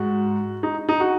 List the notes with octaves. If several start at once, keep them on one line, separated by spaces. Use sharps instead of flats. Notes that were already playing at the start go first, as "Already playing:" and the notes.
Already playing: G#2 G#3 F#4
D#4
D#4
F#4